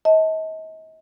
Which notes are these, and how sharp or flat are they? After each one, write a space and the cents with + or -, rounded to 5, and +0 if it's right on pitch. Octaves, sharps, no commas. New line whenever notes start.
D#5 +40 A5 +0